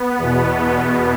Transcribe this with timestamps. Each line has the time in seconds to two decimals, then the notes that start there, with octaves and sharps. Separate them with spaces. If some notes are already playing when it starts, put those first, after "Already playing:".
Already playing: B3
0.18 E2 B2